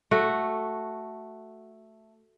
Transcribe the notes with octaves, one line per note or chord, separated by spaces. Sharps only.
A3 F#4